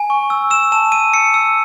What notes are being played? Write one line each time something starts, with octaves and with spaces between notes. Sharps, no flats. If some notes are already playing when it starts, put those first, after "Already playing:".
Already playing: G#5
C#6
E6
E6 E7
A5 E7
E6 D#7
E6 C#7
E6